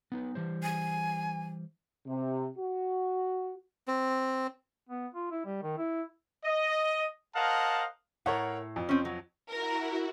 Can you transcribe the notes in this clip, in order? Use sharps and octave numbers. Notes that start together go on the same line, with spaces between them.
B3 D#4 B4
E3 G3 C5
G#5
C3
F#4
C4
B3
F4
E4
G3
D#3
E4
D#5
A#4 C5 D#5 F5 F#5 A5
A2 A#4 C#5 F#5
F2
C4 C#4
F#3
E4 F#4 A#4